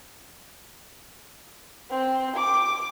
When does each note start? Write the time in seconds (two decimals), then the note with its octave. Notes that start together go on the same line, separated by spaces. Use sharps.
1.91 C4
2.36 D6